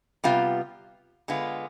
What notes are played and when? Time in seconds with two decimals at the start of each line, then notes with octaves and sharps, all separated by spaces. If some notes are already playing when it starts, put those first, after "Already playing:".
0.24 C3 G3 B3 F4
1.28 D3 G#3 B3 F4